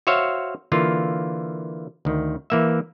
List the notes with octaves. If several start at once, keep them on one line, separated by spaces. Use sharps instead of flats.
F#4 C5 C#5 E5 F5
D3 E3 A#3 F4
D2 D#3
E3 A#3 E5